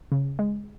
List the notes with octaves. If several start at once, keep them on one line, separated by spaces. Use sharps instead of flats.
C#3
G#3